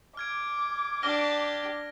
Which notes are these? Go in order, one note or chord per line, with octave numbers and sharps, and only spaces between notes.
D6 F6 G#6 D7
D4 G4 F6 A#6 G7